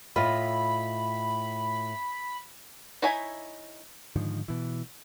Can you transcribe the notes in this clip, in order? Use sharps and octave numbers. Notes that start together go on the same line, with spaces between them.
A2 F4 D#5 B5
D#4 E4 C#5 E5 G#5
G#2 D3 D#3 F3
B2 E3